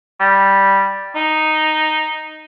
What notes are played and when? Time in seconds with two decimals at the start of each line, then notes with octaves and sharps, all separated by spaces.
0.20 G3
1.16 D#4